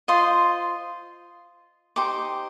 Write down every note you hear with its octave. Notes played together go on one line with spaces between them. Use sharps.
F4 C5 D#5 C6
D#4 G4 C5 D6